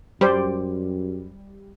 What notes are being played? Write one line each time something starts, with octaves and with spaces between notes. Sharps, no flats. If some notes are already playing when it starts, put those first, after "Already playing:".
F#2 G3 G4 C5 D5